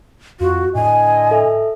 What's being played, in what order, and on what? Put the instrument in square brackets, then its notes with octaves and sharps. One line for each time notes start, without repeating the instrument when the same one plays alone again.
[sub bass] F2 [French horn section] F4 [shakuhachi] F#4
[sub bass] A2 [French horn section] D3 D#5 [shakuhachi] G#5
[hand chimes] A4 E5